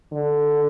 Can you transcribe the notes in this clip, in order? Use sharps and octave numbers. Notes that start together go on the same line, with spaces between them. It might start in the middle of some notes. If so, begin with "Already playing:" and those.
D3